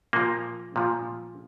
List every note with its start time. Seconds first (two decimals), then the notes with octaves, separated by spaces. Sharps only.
0.13 A#2 F3 A#3
0.76 A#2 F3